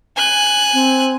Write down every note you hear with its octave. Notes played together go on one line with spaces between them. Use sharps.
G#5 F#6
C4